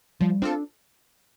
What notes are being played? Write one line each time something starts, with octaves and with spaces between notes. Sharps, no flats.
F3 G3
C4 D4 F4 A4